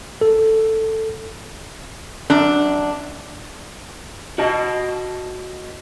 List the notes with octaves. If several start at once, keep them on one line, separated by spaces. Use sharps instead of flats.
A4
F#2 D4
F#4 D#5 A5